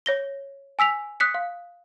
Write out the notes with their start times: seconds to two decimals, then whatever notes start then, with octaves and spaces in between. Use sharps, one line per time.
0.06 C#5 A#6 G7
0.79 G#5 E6 B6 F7
1.20 D#6 F#6 B6 C#7
1.34 F5